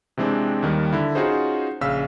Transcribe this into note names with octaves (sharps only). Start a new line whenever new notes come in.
C3 E3 G#3 C4 D4
D#2 D#3 G3
D3 E4
C#4 D#4 F4 F#4 G#4 C5
A#1 C#3 F5 E6 B6